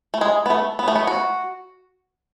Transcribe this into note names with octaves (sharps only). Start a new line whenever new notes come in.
A3
G#3
B3
A3
B3
A3
B3
F#4